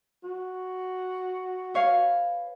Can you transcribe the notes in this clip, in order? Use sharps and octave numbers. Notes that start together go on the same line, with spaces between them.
F#4
B4 C#5 F5